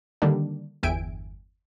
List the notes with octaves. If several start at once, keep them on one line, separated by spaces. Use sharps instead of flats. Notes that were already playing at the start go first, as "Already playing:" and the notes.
D3 D#3 G3 A#3 D4
G1 E2 E5 G5 G#5 D7